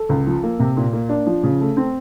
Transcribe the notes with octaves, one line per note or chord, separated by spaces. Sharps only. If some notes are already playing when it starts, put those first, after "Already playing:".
Already playing: A4
C#2
F3
A#3
C3
A#2
A#3
D4
F3
C#3
A3
C4